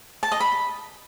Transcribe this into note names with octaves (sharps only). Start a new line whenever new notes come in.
A5
D#5
B5